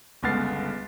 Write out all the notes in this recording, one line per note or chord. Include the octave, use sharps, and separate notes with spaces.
G1 C#2 B3 F6 A6 C7